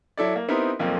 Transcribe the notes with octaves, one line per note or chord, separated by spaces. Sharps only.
F#3 E4 A4 D5
A#3
B3 C4 D#4 E4 G4 A#4
B1 F2 F3 A#3